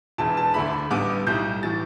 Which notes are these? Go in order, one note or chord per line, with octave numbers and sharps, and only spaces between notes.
E1 E2 E3 A5
A5
D2 D3 A3 D4 B5
A1 G2 G3 B3 D6
B1 A2 G3 G6
A2 E3 A6